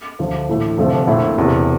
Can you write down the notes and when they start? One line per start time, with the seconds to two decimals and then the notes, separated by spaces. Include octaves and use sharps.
0.19 D2 D3 F3
0.49 A#1 A2 E3 A3
0.77 F1 F2 D3 F3 A3
1.07 A#1 A#2 A3 E4
1.36 E1 E2 C3